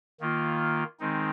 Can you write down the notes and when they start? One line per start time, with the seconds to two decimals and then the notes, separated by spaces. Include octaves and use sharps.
0.20 D#3 A#3 F4
1.00 D#3 G#3 C4 D#4